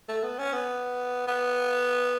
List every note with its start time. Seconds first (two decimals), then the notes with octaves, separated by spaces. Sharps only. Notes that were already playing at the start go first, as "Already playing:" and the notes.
0.09 A3
0.23 B3
0.38 C#4
0.53 B3
1.27 B3